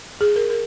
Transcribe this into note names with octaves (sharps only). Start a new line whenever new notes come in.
G#4
A#4
A#4